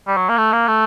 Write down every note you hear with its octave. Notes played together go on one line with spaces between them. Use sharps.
G3
F#3
A#3
A3
A#3
A3